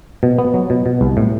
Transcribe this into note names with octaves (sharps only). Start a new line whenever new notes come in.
B2
B3
F#3
B2
B2
C2
A2